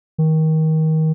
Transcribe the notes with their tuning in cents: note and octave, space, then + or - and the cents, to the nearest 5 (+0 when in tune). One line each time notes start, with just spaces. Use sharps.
D#3 +25